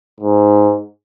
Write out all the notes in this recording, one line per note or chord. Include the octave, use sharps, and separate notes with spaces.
G#2